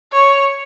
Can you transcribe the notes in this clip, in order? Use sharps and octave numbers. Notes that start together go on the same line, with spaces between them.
C#5